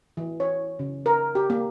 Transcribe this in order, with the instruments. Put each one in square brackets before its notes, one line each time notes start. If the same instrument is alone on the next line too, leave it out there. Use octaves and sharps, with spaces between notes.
[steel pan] E3
C#5
C#3
A#4
G4
A#3